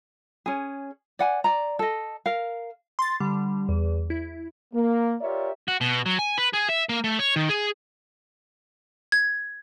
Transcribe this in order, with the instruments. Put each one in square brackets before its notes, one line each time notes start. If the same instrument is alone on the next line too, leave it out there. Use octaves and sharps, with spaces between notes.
[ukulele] C#4 G#4
D5 F#5 G#5
D5 A#5
A4 D#5
A#4 F5
[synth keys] C6 A6
D3 G3
E2
E4
[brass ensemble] A#3
F4 G4 A#4 C#5 D5 E5
[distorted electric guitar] F#4
B2
F#3
G#5
B4
G#4
E5
A#3
A3
C#5
D#3
G#4
[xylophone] G#6